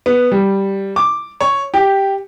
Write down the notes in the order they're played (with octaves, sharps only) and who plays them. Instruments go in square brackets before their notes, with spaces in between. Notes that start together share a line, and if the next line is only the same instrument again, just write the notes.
[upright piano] B3
G3
D6
C#5
G4